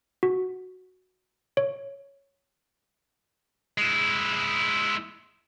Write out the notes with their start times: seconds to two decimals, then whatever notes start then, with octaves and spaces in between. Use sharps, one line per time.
0.23 F#4
1.57 C#5
3.78 G#3 E4